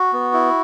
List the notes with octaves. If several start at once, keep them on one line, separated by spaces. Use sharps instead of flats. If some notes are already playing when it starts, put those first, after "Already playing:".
Already playing: F#4
B3
E4